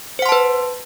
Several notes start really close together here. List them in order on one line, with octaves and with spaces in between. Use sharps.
C5 F#5 C6 A5 B4